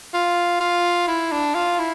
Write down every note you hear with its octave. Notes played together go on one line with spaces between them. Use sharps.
F4
F4
E4
D4
F4
E4